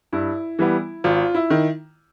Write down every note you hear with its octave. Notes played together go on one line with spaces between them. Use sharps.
G2 E4
E3 G3 B3
G#1 F4
E4
D#3